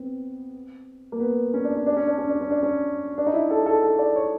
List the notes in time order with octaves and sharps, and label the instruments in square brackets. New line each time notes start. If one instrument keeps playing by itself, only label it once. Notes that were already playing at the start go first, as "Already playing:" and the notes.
Already playing: [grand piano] B3 C4
A#3
B3
C#4
D4
C#4
D4
C#4
D4
C#4
D4
C#4
D4
C#4
D4
D#4
E4
A4
G#4
A4
A4
D5
C#5